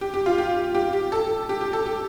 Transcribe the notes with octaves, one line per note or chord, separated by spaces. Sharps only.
G4
G4
F4
G4
G4
G4
A4
G4
G4
A4
G4